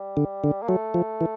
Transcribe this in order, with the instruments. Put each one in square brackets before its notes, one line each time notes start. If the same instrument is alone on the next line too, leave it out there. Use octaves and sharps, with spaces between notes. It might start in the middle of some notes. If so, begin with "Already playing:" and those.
Already playing: [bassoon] G3
[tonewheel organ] D3
D3
[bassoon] A#3
[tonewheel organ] F#3 [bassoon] A3
[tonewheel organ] F3
E3